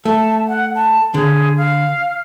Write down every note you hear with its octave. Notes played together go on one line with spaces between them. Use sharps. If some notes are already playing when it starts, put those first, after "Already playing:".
A3 A5
F#5
A5
D3 G#4
F5